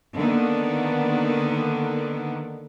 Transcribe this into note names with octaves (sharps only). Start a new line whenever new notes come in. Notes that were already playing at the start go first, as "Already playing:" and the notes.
D3 D#3 A#3 B3